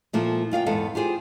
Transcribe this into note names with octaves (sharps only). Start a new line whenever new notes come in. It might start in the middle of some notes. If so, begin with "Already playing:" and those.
A#2 F3 A#3 E4 A4
F#2 F4 F5 G5
E2 G#2 B3 A4 F5
F4 G4 G#4 C5